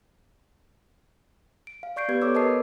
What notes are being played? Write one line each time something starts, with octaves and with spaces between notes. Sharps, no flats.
D7
F5
D5 C#6 G6 C7 D7
B3 G4 B4 G#6
B3 A4 C#5 D6 E6
A#4 B4 D#5 A5 D#6 C7